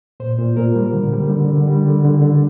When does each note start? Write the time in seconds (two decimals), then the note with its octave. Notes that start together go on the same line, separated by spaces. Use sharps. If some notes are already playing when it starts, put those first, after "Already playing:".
0.20 A#2 C5
0.39 A#2
0.56 A#2 A#4
0.75 G3
0.94 D3
1.12 G3
1.30 D3
1.48 D3
1.67 G3
1.85 D3
2.04 D3
2.22 D3